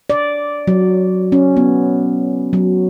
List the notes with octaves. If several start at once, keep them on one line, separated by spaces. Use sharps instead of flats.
D5
F#3
C#4
B3
F#3